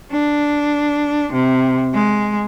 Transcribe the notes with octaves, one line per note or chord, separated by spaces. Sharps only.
D4
C3
G#3